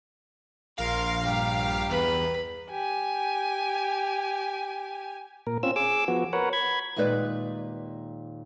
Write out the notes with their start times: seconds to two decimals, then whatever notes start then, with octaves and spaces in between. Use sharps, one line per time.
0.78 A#1 A#4 F5 C6
1.23 G2 G4 A#5
1.90 E2 B4
2.70 G4 G#5
5.47 A#2 A#4
5.63 C4 C#4 F4 E6
5.76 G#4 D6 E6
6.08 F3 B3 F#4
6.33 A#4 B4 C#5 F#5
6.53 B5 G#6
6.96 D#2 A#2 G#3 D#4 B4 D5